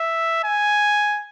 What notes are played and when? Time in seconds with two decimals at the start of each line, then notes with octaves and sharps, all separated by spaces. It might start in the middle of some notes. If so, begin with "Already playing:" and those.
Already playing: E5
0.44 G#5